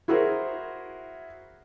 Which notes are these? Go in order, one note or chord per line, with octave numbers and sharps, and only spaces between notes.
E4 F#4 G#4 A#4 C5